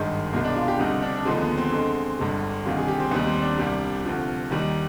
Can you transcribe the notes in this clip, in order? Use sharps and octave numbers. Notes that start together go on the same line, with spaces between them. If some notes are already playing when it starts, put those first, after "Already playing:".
Already playing: G#1 G2 D#3 G#3
C2 B2 G#3
D4
F4
G4
D2 C3 G3 D#4
D4
D4
D#2 D3 F3 G#3 C4
B3
C4
D2 D3 G#3
G1 G2 D3 G#3
D2 C3 D#3 G3 F4
G#4
G4
C4
D#2 D#3 G3 B3
C4
D4
C2 C3 G3
D2 C3 F3
D#2 D#3 G3